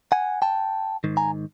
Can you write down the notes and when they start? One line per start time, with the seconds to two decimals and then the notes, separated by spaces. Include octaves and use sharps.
0.12 F#5 G#5
0.42 G5 A5
1.04 G#2 D#3
1.17 G#5 A#5